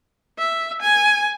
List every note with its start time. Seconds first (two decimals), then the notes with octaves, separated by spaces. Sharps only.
0.38 E5
0.82 G#5